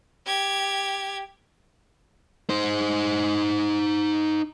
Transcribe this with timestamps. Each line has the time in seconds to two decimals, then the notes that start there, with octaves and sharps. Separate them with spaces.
0.25 G4 G#6
2.50 D#4 C5